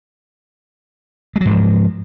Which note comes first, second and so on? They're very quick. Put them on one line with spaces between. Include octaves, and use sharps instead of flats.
G#3 F#3 G#2 F3